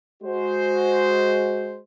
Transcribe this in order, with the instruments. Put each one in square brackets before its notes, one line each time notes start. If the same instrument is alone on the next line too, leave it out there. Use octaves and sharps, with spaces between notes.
[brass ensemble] G#3 F#4 C5